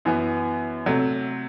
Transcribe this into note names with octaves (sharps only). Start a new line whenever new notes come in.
F#2 E3 B3
C3 F#3 A3